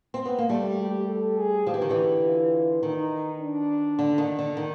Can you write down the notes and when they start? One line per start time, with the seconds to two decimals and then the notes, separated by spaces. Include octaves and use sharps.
0.14 C4
0.25 B3
0.39 A#3
0.49 G3 A3 G4
0.79 G4
1.08 A4
1.37 G#4
1.66 F3 G4
1.74 E3
1.81 D#3
1.89 D3 E3
2.25 F4
2.83 D#3 D#4
3.41 D4
3.99 D3
4.18 D#3
4.39 D3
4.57 D#3